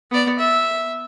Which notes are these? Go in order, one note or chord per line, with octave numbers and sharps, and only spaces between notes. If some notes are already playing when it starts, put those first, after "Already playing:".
B3 D5
E5